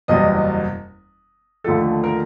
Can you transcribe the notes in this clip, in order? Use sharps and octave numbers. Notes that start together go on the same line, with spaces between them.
F#1 E2 B2 G3 D#5
D#2 D3 F3 A3 A4
A#4